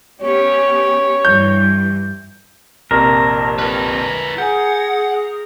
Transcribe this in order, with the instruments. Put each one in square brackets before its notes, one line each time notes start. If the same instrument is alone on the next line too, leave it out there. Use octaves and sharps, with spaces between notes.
[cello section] B3 C#4 G4 [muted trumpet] C#5
[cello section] G2 E3 [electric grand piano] G6
[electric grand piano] A#1 F2 C3 [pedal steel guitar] A#4 [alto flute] A5
[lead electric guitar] F4 B4
[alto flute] G#4 [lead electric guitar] F#5 [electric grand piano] G#5 G6